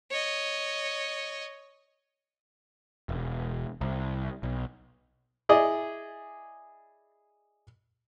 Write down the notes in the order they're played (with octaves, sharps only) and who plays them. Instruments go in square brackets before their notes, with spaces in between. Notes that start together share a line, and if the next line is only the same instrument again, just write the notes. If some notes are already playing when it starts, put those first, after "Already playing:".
[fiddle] C#5 D#5
[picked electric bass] E1
C2
B1
[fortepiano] E4 G#4 D5 D#5